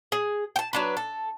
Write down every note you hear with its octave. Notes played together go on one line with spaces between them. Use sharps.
G#4
G5 A5
F#3 D4 B4
A4